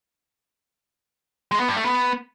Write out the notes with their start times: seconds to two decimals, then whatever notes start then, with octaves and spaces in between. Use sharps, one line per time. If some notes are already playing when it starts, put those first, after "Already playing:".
1.51 G#3
1.60 B3
1.68 G2
1.77 A3
1.85 B3